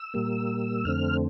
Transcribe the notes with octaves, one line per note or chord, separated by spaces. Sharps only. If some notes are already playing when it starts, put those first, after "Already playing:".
Already playing: E6
A#2 G3 A#3
F2 D3 A3 C4 F6